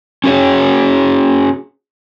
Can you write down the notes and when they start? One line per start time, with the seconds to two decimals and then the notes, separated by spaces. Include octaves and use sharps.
0.24 C#4 F#4 G#4 C#5